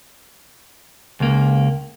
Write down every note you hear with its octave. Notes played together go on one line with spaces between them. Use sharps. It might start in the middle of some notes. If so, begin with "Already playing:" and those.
C#2 A#3